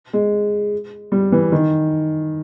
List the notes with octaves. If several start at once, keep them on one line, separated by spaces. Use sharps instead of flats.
G#3
G3
E3
D#3